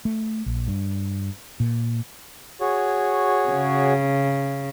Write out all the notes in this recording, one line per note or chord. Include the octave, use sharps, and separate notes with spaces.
A3
A#1
G2
A#2
F#4 G#4 C#5
C#3